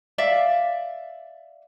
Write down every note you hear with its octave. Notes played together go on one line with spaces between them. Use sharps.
D5 E5 F5